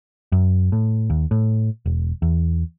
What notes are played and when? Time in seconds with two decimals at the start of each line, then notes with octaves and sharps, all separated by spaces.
0.32 F#2
0.72 A2
1.10 D#2
1.31 A2
1.86 E1
2.22 E2